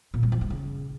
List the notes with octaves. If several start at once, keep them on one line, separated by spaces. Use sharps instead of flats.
A#2
G3
F3
G2
C#3